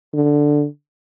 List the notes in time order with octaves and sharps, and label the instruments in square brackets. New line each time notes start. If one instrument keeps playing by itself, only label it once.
[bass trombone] D3